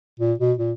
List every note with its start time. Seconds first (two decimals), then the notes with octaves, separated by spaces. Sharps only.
0.20 A#2
0.39 B2
0.59 A#2